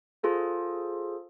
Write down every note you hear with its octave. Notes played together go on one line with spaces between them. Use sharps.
F4 G#4 A4 C5